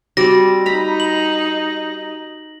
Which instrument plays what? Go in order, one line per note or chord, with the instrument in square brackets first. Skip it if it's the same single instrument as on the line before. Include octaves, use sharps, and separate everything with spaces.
[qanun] G3 C4 D5 [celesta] F#4 [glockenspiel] A#6
[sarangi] D#4 [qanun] A#5 B5
[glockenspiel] F#7